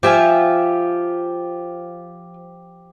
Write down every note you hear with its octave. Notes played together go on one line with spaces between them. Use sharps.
F3 G4 E5 G#5